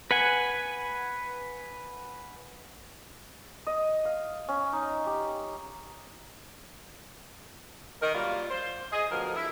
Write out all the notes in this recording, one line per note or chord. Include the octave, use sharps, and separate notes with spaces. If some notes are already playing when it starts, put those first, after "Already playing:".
B4 F#5 G#5
D#5
F5
C#4
D#4
G4
D#3 A#4
F#3 G3 A#3 F4
C5
G#4 D#5
D2 B2 F3 A#4
E4